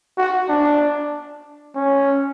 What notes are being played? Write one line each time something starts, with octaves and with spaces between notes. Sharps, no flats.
F#4
D4
C#4